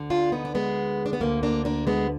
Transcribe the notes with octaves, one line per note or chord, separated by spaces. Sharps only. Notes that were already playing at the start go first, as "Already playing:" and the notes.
Already playing: D2 D3
D4 F4
B3 D#4
D4
G#3 B3
D4
B3
D2 D3 A#3
A#3 D4
A#3 D4
G#3 B3